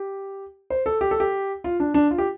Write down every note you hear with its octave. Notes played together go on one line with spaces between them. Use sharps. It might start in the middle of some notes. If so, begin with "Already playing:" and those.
Already playing: G4
C5
A4
G4
A4
G4
F4
D4
D4
F4
G4